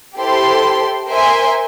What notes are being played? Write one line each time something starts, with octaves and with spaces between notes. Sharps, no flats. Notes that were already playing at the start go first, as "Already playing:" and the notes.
E4 G4 A4 C5 C6
A#4 C5 E5 G#5 C6